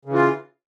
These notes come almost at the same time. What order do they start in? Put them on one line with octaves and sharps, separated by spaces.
C#3 E3 F4